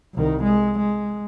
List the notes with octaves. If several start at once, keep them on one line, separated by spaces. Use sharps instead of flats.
C2 D#3
G#3
G#3